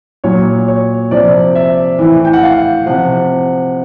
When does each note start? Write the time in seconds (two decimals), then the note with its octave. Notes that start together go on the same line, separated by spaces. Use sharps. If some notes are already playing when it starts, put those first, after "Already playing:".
0.24 A#2 F#3 C#5
0.68 C#5
1.11 C3 F3 D5
1.55 E5
1.99 A2 E3
2.25 G5
2.33 F#5
2.43 F5
2.86 C3 F3 F#5